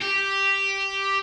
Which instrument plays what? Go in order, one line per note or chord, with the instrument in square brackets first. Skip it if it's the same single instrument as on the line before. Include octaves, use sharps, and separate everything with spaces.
[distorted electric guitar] G4